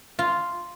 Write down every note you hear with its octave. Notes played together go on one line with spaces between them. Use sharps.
F4